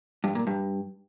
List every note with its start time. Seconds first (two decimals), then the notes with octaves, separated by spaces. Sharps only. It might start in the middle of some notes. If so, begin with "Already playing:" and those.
0.24 G2
0.35 A#2
0.47 G2